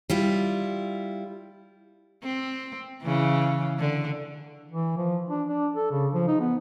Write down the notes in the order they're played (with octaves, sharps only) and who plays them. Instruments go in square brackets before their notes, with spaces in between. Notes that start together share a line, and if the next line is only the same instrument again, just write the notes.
[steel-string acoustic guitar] G3 E4 F4
[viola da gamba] C4
C#3 E3
D3
[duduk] E3
F3
D4
D4
A4
C#3
F3
D#4
B3